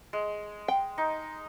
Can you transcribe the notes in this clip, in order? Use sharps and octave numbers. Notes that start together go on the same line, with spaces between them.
G#3
G5
D#4